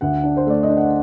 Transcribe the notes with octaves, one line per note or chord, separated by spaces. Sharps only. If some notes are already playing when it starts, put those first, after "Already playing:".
D2 F#5
D4
C5
A3 D5
D#5
D4
F#5